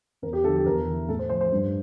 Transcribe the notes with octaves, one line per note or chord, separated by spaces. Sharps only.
E2 A#4
G4
D3 F3 A4
G4
E2 A#4
E3
A2 A4
C5
F3 C5
C5
G2